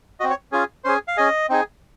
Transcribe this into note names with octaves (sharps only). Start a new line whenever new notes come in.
C4 F#4 D#5
C#5
C#4 F4 G#4
C#4 G#4 C5
F5
C#4 G#4 D#5
C4 D#4 G#4